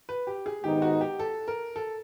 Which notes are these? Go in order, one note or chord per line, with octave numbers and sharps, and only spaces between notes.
B4
G4
G#4
G#2 D#3 G#3 B3 D#4 G4
F#4
G4
A4
A#4
A4